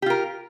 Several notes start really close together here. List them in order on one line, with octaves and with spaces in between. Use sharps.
G4 F4 A#4